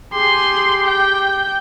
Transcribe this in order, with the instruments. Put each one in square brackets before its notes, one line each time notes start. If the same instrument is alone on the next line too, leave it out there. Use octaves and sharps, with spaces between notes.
[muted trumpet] G4 [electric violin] G#4 C6
[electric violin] G5